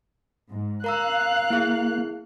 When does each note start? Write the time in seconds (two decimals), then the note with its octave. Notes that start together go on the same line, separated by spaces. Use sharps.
0.48 G#2
0.84 A#4 F5 A#5 E6 F#6
1.50 A#3 E4 G#4